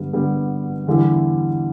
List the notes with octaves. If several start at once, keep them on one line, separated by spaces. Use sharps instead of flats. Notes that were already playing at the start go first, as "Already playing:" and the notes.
Already playing: G2 D3 G3 B3
G2 D3 G3 B3
E2 D3 G3 E4 G4